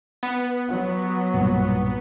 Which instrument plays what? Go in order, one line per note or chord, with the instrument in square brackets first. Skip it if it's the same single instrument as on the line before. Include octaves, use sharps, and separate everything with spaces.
[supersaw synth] B3
[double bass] F#3
[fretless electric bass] B1 G2 A#2